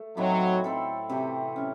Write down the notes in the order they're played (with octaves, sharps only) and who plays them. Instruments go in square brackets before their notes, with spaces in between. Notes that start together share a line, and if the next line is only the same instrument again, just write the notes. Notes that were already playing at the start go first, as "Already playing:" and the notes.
Already playing: [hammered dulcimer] A3
[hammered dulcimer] A2 E3 C4 D#4 [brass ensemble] F#3
[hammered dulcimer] F#3 C4 E4 A4
C3 E3 C4 F#4
F#3 C#4 E4